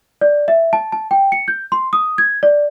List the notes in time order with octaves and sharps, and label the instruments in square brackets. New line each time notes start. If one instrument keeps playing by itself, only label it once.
[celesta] D5
E5
A5
A5
G5
C#7
G6
C6
D#6
G#6
D5